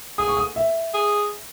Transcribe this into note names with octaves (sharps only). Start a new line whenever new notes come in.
G#4 D#6
C#6
D#6
E5
G#4